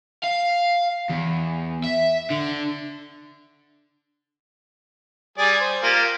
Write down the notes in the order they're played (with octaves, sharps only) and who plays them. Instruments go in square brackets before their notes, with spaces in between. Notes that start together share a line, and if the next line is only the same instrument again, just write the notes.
[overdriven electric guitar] F5
E2
E5
D3
[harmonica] G3 G#4 D5
C5
A#3 F4 G4